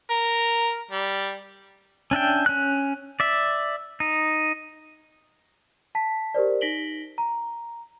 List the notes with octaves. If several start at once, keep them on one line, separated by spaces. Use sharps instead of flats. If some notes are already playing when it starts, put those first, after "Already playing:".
A#4
G3
C#4 D4 E5 G5
C#4 F#6
D5 E5
D#4
A5 B6
G4 A#4 C5 D5
D#4 A#6 B6 D7 F#7 G7
A#5